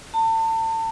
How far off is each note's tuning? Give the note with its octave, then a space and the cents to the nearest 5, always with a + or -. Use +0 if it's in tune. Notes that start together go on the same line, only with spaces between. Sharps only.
A5 +35